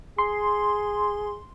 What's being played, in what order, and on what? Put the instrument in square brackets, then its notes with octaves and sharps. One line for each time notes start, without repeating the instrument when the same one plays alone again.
[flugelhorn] G#4 [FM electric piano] C6